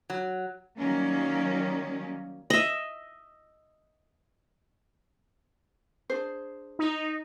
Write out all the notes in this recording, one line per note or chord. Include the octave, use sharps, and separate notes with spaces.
F#3
D#3 F#3 G3 A#3 C#4
D#5 E5
D4 G#4 C5
D#4